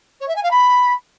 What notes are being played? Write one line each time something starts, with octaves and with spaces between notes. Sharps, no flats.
C#5
E5
G#5
F5
B5